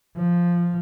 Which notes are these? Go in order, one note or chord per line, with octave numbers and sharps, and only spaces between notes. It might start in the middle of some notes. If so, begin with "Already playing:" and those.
F3